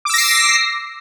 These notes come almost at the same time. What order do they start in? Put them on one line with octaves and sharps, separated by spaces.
D6 E6 A#6 C7